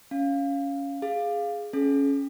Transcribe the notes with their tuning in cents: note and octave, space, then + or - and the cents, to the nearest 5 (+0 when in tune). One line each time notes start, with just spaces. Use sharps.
C#4 +10 F5 +0
G#4 +0 F5 +0
C#4 +0 G#4 +45